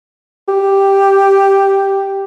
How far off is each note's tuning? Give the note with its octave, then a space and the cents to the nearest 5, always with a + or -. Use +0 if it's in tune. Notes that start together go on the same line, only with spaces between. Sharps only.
G4 +0